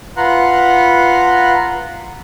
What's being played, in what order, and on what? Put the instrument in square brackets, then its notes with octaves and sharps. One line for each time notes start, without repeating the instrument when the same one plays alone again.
[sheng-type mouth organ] F4 B4 F#5 A#5 C6 F#6